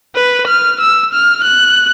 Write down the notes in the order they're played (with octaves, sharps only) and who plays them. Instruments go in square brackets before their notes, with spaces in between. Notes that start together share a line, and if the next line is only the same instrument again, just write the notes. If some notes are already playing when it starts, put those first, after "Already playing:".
[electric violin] B4
F6
E6
F6
F#6